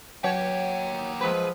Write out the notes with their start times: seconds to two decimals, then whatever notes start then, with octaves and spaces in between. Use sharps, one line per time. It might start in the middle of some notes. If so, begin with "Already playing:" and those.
0.24 F#3 A#3 F#4 C#5 F#5 G5
1.21 F3 G#3 B4